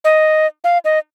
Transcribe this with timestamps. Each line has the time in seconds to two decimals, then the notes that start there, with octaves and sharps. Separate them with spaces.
0.04 D#5
0.64 F5
0.85 D#5